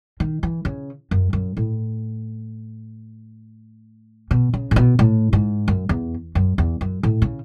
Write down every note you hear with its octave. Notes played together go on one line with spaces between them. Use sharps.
D#3
E3
C#3
F#2
F#2
A2
B2
C#3
A2
B2
A2
G#2
F#2
E2
F#2
E2
F#2
A2
C#3